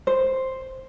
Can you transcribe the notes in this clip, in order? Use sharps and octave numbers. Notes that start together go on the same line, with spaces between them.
C5